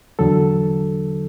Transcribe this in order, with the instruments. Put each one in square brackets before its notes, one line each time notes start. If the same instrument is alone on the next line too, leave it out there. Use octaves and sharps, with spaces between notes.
[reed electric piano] E2 D3 F#3 A4